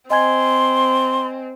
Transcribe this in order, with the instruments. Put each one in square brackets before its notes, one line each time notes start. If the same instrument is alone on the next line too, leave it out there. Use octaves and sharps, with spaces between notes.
[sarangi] C4 [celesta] D#5 G#5 G#6 [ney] C6